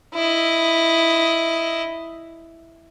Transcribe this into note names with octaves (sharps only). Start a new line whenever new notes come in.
E4 D#5